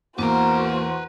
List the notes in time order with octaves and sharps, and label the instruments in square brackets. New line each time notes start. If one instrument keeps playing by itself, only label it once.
[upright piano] E2 [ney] A#3 [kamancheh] F#4 C5 [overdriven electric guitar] B4 A#5